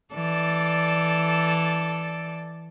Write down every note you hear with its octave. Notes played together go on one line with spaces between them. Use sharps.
E3 A4 D5